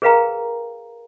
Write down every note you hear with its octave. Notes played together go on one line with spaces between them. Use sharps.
G#4 A#4 B4 F5 G5 A#5